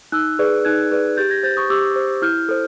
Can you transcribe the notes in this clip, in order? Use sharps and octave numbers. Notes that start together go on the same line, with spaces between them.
D#4 E6 F#6
G#4 B4 D5
D#4 F#6 G#6
G#4 B4 D5
G4 G6 A6
G#6 A#6
C5 G6 A6
C#6 D#6
G4 D6 E6
C5
E4 F6 G6
A4 C5